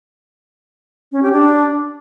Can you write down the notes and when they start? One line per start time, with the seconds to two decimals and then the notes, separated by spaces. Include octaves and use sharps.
1.12 C#4
1.23 G4
1.33 D4